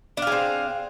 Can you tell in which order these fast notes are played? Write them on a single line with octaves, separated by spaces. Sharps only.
D4 F5 G#4 C4